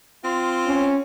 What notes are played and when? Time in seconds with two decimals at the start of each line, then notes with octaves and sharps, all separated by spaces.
0.24 C4 F4
0.67 C#4